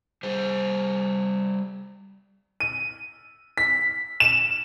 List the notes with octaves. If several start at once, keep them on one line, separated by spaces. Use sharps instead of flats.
G3 G#4 C5
D#7
B6
E7